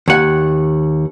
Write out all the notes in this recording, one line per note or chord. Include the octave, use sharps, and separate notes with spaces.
D#2 F#5